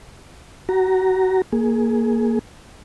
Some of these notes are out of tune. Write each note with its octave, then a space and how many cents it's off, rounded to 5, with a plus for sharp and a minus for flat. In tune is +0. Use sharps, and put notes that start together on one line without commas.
F#4 +25 A#5 +0
A#3 +0 G#4 +15